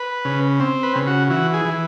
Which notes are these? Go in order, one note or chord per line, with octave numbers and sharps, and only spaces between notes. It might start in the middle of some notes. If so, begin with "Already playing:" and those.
Already playing: B4
C#3
C4
B4
C#3
F#4
E3 F#4
G#4
E3